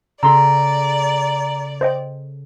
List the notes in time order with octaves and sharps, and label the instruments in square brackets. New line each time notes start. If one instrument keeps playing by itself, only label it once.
[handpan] C#3 C#4 A4 [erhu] D5 [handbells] A#5 [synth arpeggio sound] C6 E6
[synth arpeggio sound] C5 D#5 G5